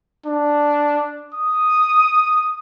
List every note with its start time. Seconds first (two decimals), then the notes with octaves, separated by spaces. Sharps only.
0.26 D4
1.34 D#6